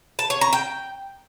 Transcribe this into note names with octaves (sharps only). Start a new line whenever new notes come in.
A5
C#5
A#5
G5